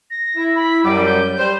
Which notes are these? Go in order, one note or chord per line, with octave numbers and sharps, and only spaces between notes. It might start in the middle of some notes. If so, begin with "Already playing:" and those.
A#6
E4
B5
F#2 G3 D6
G6
G3 C5